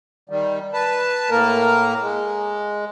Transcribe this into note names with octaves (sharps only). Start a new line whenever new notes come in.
D#3 G3
B4 A5
A2 A#3 A#4
G#3